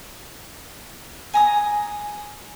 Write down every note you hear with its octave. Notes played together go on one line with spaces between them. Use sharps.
G#5 A#5 D#6